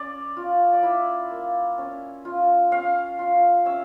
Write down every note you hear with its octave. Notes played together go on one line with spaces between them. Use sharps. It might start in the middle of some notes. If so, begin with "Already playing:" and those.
Already playing: C#4 D5
F4
D5
E4 E5
A#3
C#4
F4
C#4 F5
F4
C#4 E5